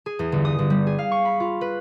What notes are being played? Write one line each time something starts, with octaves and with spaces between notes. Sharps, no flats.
G#4
E2
G1
D#6
G1
G3
G#4
F5
C#6
B5
F4
B4